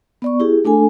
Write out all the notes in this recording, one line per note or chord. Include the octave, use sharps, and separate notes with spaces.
B3 D5 C#6
E4 G4 G#4
A3 D4 A4 G#5